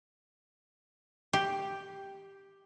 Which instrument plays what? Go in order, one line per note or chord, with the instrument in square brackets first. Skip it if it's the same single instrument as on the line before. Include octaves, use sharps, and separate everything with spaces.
[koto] G4